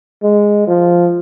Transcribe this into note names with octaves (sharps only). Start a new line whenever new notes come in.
G#3
F3